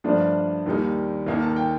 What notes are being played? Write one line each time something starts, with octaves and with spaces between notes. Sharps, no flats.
G2 F3 A3 D4 D5
D#2 D#3 G3 A#3 D#4
D#2 D#3 A#3 D#4
A5
G5